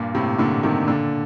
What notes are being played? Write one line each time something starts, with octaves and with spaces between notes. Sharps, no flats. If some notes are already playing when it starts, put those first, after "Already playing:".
Already playing: G2 A#2
A2 C3
A#2 D3
C3 D#3
A#2 D3